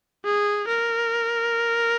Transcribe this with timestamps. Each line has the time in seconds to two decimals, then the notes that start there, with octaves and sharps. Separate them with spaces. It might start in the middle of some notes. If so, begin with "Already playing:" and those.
0.25 G#4
0.68 A#4